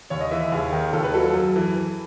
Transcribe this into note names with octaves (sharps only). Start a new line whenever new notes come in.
D#2 C#5
D#5
E3 E5
E5
D#2 G#4
D#3
D#2 A4
B4
F#3 A4
A4
F#2
E3
E3